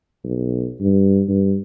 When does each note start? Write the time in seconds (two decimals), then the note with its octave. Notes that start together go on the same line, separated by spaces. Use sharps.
0.24 B1
0.80 G2
1.29 G2